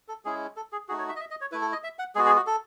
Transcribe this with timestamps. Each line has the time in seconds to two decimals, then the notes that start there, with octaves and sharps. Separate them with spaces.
0.08 A4
0.25 G#3 C#4 E4 G#4
0.56 A4
0.72 G#4
0.88 A3 D#4 F#4 G#4
0.98 C#5
1.09 E5
1.16 D#5
1.20 E5
1.31 D#5
1.41 C#5
1.52 A3 E4 B4
1.61 A4
1.72 D#5
1.83 E5
1.99 F#5
2.15 G#3 B3 F#4 G#4
2.26 G#4
2.36 F#4
2.47 A4